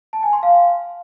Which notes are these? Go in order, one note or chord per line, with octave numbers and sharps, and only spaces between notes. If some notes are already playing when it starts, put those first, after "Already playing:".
A5
G#5
C6
F5